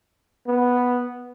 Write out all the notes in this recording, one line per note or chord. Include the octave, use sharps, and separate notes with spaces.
B3